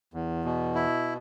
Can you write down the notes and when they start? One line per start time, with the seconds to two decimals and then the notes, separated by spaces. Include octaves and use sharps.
0.14 E2
0.45 B2
0.75 E4